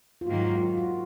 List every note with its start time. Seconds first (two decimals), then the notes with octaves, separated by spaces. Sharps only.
0.21 F4
0.27 G#2 D#3 F#3 A#3 F#4
0.47 F4
0.57 F4
0.67 F4
0.78 F#4